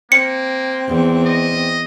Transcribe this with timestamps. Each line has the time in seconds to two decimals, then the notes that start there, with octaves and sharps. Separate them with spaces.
0.12 A#3 C4 C#7
0.88 E2
1.26 D#5